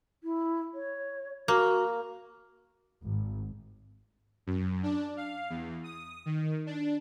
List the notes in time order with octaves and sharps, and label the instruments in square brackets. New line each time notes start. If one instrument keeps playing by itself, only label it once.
[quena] E4
C#5
[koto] A#3 [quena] F#4
[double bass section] G#1
[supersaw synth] F#2
D4
F5
E2
D#6
D#3
D4